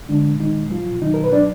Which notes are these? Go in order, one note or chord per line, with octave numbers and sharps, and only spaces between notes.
D3 G#3 D4
A#2
D#3 G#3 D#4
A#2
F3 F#3 F4
B2
D#3 F#3 D#4
B2 A#4
B4
F#3 D4 D5